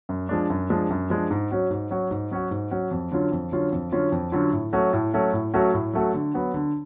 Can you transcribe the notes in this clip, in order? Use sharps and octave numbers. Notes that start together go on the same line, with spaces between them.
F#2
F3 G#3 D4
F#2
F3 G#3 D4
F#2
F3 G#3 D4
G#2
F#3 C#4 F#4
G#2
F#3 C#4 F#4
G#2
F#3 C#4 F#4
G#2
F#3 C#4 F#4
F2
D3 F#3 C#4 F4
F2
D3 F#3 C#4 F4
F2
D3 F#3 C#4 F4
F2
D3 F#3 C#4 F4
A2
F#3 A3 C#4 F#4
A2
F#3 A3 C#4 F#4
A2
F#3 A3 C#4 F#4
A2
F#3 A3 C#4 F#4
D3
F#3 B3 F#4
D3